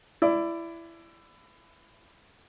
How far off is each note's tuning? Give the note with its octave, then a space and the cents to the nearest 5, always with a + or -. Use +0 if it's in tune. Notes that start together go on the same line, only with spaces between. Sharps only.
E4 +20 D5 +0